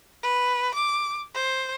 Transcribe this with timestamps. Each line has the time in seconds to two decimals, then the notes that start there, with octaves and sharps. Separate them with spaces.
0.23 B4
0.74 D6
1.34 C5